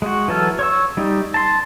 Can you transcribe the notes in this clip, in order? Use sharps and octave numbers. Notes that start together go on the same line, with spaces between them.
G#3 F#4
E3 F#3 A4 F6
C#5 C#6 E6
G3 D#4
A5 C6